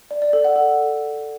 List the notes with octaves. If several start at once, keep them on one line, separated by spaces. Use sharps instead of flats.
D5
D5
A4
F#5
A4